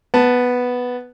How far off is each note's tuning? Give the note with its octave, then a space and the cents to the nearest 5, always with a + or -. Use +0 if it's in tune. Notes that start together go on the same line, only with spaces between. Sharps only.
B3 +0 A5 +0